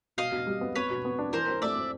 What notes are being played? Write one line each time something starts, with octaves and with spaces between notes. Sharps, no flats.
B2 D#5 F5
B2
G3
B3
B3 B4 C#5
B2
B3
D4
E3 A#4 C5
C4
A3 D5 E5
C4